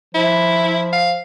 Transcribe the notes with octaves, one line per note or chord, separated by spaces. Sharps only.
F3 E4
F5